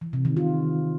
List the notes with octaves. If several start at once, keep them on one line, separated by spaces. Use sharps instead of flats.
E3
C3
D#3
F4